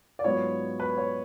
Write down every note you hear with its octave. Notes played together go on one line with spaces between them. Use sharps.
D5
G#2 F#3 B3 F4 C#5
B4
C#5